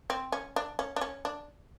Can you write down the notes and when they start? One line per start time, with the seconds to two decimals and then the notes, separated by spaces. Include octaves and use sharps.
0.10 C4
0.32 C#4
0.56 D4
0.79 C#4
0.96 D4
1.01 C#4
1.25 D4